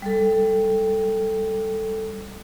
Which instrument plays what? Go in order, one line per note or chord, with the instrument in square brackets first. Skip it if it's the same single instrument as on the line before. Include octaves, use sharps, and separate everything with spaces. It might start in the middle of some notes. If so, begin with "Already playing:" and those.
[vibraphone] G3 A4